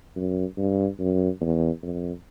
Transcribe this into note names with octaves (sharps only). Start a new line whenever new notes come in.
F#2
G2
F#2
E2
F2